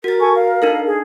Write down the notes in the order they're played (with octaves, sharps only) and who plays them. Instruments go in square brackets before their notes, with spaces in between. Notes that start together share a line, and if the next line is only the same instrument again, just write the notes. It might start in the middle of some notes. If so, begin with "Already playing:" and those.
[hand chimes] F#4 A6 [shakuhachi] A#4
[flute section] A4 G#5 C#6
F5
[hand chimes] D4 D#4 A4
[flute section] G#4